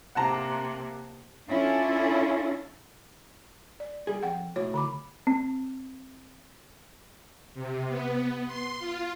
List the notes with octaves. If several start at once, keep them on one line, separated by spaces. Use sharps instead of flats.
C3 A#3 F#5 A5 A#5
C#4 D4 E4 F4 A4
D5
G3 G#4
F2 F#5 G5
B1 A2 F#4 C#5
D3 B5 D6
C4
C3
B3
C6
F4